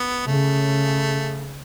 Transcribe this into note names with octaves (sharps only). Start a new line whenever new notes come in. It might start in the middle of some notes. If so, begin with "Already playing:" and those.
Already playing: B3
C#3 A3